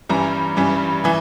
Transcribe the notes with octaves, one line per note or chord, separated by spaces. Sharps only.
G2 E3 G3 C#4 A#5
G2 E3 G3 C#4
E3 G#5